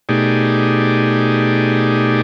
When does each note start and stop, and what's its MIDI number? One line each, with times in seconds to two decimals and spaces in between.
0.09 2.21 47
0.09 2.21 57
0.09 2.21 63
0.09 2.21 67
0.09 2.21 68
0.09 2.21 74